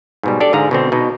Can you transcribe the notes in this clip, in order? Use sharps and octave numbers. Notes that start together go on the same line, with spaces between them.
G#2 B2 G3
D4 G4 A4 D5
G#2 D3 G#4 F5 A#5
B2 D3 C4
B2 D#4